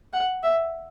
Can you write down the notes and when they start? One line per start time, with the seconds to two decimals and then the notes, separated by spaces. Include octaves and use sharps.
0.13 F#5
0.43 E5